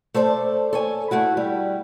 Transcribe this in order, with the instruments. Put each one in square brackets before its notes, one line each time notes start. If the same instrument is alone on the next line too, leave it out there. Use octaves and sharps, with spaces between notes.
[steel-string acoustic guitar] A3 A4 C5 D5
A4 C#5 G#5
A3 E4 F#4
G3